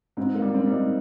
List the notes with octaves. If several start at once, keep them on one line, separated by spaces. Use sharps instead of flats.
G#2 C4
A#3
G3
C4
G3
D#4